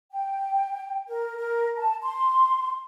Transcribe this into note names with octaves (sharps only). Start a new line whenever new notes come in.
G5
A#4
A#4
A5
C6